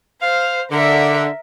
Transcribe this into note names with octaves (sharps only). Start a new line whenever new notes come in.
C5 F5
D3 A#4 E5